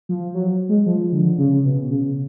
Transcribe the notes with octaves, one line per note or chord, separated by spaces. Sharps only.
F3
F#3
G#3
F3
D3
C#3
B2
C#3